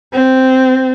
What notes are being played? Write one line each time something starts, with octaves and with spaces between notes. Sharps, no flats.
C4